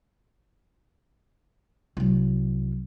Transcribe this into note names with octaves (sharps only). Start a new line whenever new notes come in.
C2 F#3